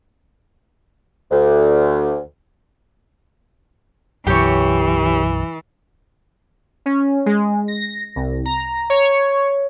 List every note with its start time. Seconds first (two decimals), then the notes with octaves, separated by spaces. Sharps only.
1.31 D2
4.27 B1 F#2 E3 G4 C#5
6.86 C#4
7.26 G#3
7.68 A#6
8.16 C2
8.45 A#5
8.90 C#5